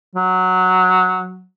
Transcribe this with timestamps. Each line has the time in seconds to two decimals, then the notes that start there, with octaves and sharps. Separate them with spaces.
0.15 F#3